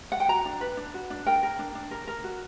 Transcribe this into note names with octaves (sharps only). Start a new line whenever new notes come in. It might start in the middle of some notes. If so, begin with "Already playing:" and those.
F#5
G5
F#4 A#5
D4
B4
D4
F#4
D4
A#4 G5
A#4
D4
D4
A#4
A#4
F#4